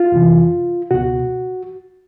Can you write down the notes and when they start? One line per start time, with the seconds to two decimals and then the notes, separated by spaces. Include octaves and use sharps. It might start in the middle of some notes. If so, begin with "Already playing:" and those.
Already playing: F4
0.12 F2 C3 E3
0.91 C#2 B2 F#4